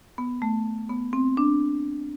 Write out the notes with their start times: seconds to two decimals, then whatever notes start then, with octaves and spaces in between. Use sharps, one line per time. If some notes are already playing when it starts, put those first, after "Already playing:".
0.18 B3
0.42 A3
0.89 B3
1.13 C4
1.37 D4